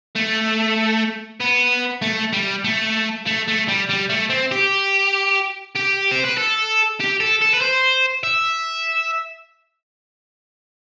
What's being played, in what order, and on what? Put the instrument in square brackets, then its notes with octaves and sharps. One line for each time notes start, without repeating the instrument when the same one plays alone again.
[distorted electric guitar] A3
B3
A3
G3
A3
A3
A3
G3
G3
A3
C4
G4
G4
C5
B4
A4
G4
A4
A4
B4
C5
E5